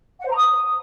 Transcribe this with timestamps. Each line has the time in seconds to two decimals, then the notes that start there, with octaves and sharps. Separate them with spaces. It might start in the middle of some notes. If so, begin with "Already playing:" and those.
0.20 F#5
0.26 C5
0.31 A#5
0.37 D#6